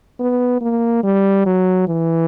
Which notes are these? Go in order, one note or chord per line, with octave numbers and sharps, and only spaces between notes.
B3
A#3
G3
F#3
E3